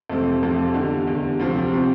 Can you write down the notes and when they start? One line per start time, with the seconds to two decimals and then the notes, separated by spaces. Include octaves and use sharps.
0.10 F2 C3 F3 A3 C4
0.42 F2 C3 F3 A3 C4
0.74 E2 D3 G3
1.07 E2 D3 G3
1.39 D2 C3 F3 C4
1.73 C3 F3 C4